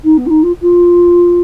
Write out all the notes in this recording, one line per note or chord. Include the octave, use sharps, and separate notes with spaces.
D#4
B3
F4
D#4
F4
F4